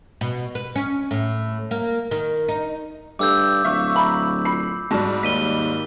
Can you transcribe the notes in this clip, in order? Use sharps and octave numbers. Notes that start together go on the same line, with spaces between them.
B2
B4
C#4
A2
A#3
D#3
D#4
G2 A3 D6 E6 G6
D1 E5 F5 C#6
A#5 B5
F4 B5 C7
G#2 G3 F#4 A5
D#2 B6 D#7 G7